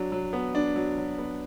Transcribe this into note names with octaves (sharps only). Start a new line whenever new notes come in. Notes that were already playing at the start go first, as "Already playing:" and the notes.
Already playing: F#3 D4
F#3
B3
D4
F#3
F#3
B3